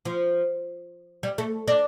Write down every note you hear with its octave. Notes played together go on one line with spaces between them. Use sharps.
F3
G3
A3
D4